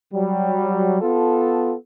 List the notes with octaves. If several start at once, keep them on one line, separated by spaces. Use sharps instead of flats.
F#3 G3
B3 F4 A4